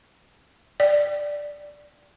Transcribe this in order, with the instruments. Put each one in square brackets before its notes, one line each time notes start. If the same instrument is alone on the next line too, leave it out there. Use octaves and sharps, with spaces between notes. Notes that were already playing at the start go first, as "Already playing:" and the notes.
[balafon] D5